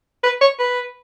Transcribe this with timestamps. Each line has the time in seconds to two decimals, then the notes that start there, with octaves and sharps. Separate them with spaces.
0.24 B4
0.41 C#5
0.59 B4